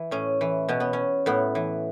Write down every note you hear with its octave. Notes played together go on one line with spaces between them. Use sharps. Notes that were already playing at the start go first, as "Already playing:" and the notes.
Already playing: E3
A2 C#4
E3
B2 C#4
B3
C#4
A2 B3
E3